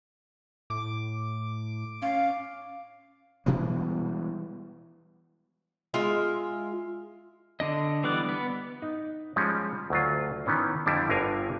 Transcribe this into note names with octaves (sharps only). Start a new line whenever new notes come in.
A2 D6
C#4 F5
B2 E3 G3 G#3
G#3 F4 E5
D3 D4 D#5
E3 G3 B3 D5 F#6
B3
D#4
F3 G3 G#3 C#4
D2 F#3 F4
D#3 E3 B3 C#4
F2 D3 G3 D4 E4
G1 G2 D3 A#4 F5 G#5